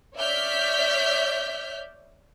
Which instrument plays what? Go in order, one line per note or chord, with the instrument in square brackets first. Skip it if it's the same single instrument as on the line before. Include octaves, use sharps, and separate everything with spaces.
[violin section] C#5 D5 E5 F6 G6 B6